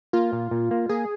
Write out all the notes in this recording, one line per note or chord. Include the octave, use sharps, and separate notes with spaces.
A#3 F4
A#2
A#2
A#3
A#3 G#4